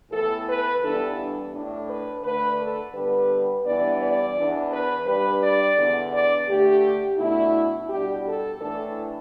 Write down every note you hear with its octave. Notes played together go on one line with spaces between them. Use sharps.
A2 E3 B3 A4
B4
G2 E3 G3 B3 D4 A4
A2 A3 D4
B4
D3 A3 D4 B4
A4
D3 G3 B3 B4
G2 E3 B3 D4 D5
D5
E2 E3 B3 D4
B4
G2 G3 D4 B4
D5
E2 D3 B3
D5
D3 A3 D4 G4
B2 A3 D4 E4
B2 G3 D4 G4
A4
A2 E3 A3 D4 A4